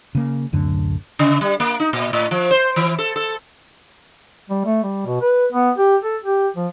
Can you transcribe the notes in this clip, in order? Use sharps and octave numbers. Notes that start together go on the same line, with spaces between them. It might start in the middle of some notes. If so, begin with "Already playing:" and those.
C#3 A#3
D1 F#2 D3
C#3
G3
A#3
D#4
A#2
A2
F3
C5
E3
A4
A4
G3
A3
G3
B2
B4
B3
G4
A4
G4
F3